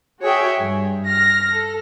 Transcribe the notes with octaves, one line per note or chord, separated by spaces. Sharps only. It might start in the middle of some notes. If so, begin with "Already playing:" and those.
F#4 G#4 C#5 E5 G5
G2
F6 A#6
A4